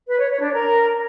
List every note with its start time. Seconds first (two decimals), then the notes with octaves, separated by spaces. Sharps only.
0.08 B4
0.19 C#5
0.30 C#5
0.41 D4
0.52 A#4